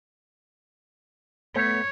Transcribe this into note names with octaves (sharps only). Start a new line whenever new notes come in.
A3 B3 C#5